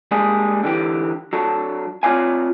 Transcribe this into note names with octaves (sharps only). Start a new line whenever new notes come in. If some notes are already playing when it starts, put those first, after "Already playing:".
G3 G#3 A#3 D4 G#4
D3 E3 G4
F#3 D4 A4
C4 F4 C#5 D5 F5 G#5